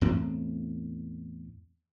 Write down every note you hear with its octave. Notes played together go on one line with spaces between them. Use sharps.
E2 A2 C4